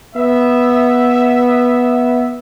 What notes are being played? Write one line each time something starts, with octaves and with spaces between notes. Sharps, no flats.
B3 E5